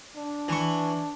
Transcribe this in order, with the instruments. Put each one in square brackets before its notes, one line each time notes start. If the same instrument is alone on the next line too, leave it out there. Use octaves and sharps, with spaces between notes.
[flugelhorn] D4
[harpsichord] E3 C#6